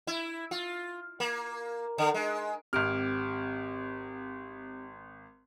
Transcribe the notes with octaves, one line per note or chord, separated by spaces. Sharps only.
E4
F4
A#3
D3
G#3
G#1 C4 G4 F6 D7